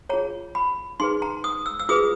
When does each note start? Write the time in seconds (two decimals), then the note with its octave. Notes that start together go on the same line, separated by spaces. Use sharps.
0.09 F4 G#4 C#5 A#5
0.55 B5
1.00 D#4 G#4 B4 C6
1.22 A#5
1.44 D#6
1.66 E6
1.79 E6
1.89 F4 G#4 B4 D#6